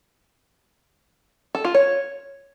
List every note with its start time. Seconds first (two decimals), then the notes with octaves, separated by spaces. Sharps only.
1.55 A4
1.65 F4
1.74 C#5